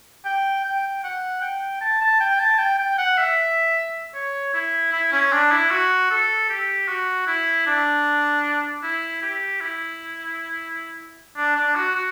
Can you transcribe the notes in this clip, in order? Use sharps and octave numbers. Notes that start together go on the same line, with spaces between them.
G5
G5
F#5
G5
A5
A5
G5
A5
G5
G5
F#5
E5
C#5
E4
E4
C#4
D4
E4
F#4
A4
G4
F#4
E4
D4
E4
G4
E4
D4
D4
F#4
F#4